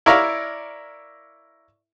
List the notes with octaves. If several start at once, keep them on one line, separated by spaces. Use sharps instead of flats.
E4 A#4 C#5 D5 F5 A#5